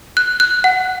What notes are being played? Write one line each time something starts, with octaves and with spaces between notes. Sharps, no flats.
F#6
F#6
F#5